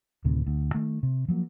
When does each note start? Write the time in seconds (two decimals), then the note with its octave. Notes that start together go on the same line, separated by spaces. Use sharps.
0.25 D2 A2 C3 D#3
0.47 D2
0.74 D#3 A3
1.03 C3
1.28 F3 F#3 A#3